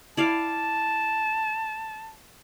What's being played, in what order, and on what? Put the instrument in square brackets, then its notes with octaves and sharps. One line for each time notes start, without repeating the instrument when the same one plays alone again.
[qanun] E4 D5 F5 [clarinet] A5